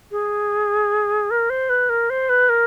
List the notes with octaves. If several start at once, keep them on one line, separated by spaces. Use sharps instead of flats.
G#4
A#4
C5
B4
A#4
C5
B4
A#4